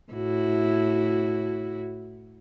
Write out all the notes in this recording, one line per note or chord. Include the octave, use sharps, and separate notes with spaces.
A2 E4 F#4